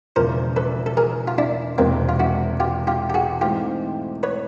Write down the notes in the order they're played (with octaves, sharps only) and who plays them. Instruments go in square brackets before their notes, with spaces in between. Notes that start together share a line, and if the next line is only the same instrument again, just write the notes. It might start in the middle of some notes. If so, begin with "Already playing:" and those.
[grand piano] E1 E2 C#3 F3 [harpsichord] A#4 C5
[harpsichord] A4 B4
A4
G#4 A#4
F4
D4 E4
[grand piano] E1 E2 C3 F3 G#3 [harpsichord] A#3 C4
[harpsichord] F4
E4 F#4
F4 G4
F4 G4
G4
F#4 G#4
[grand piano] G#2 E3 A3 C4 [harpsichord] F4 G4
[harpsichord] B4 C#5